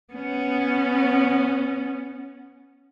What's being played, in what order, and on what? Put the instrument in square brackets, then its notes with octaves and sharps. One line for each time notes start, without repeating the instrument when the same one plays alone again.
[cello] B3 C#4